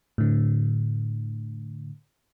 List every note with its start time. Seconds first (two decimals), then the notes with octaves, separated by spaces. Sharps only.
0.18 A2 D3